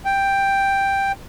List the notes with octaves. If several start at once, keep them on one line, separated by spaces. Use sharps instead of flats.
G5